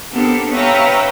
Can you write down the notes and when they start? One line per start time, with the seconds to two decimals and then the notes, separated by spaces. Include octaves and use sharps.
0.11 B3 C4 D4 G4 A4 A#4
0.52 B4 C#5 E5 F5 G5 A#5